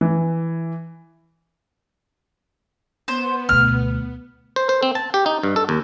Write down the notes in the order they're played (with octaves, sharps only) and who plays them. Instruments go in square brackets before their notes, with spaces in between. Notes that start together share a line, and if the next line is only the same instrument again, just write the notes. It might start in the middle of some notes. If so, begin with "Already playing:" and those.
[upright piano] E3
[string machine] B3 [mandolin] C5
[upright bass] D2 B2 [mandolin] F6
[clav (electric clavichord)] C5
C5
C4
A5
G4
D#4
G2
A4
D#2